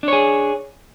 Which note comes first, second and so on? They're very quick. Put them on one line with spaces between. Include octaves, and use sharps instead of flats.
D4 C#5 G#4